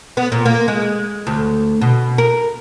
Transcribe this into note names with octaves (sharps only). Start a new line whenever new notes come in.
B3
A#2
A#3
G#3
D2
B2
A#4